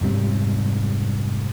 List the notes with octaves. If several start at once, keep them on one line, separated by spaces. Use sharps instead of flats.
F1 G#2 G3 C4